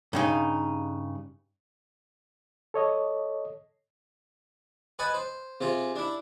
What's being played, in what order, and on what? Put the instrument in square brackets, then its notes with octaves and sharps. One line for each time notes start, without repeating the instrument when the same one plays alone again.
[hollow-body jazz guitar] G2 C#3 D#4
[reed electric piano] A4 C#5 D#5
[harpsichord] B4 D#5 F#5 G#5 A5 B5
C5
C3 F4 G#4
D4 E4